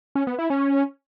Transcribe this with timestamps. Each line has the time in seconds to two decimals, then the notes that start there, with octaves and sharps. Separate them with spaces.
0.15 C#4
0.27 B3
0.39 E4
0.50 C#4